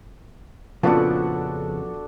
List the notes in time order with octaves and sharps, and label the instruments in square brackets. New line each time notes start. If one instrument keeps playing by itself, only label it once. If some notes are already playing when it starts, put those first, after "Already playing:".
[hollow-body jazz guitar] F2 C#3 F3 [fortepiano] A#2 B3 [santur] D4 F#4 A4